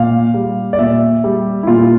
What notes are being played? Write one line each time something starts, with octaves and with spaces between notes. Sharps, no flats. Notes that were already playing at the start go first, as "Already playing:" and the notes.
Already playing: A#2 F5
G3
D5
A#2 E5
G3
E4
A#2 F4